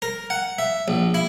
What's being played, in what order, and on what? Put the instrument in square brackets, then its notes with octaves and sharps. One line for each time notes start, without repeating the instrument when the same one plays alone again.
[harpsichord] A#4
F#5
E5
A#1
E4